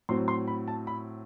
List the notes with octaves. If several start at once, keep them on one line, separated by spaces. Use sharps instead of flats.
A2 F#3 C4 C6
C6
B5
A5
B5